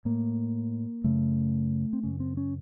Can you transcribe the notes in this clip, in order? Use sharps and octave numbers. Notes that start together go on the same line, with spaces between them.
A2 A#3
F#2 C#3 A3
C4
F#2 C#3 C#4
C4
C#4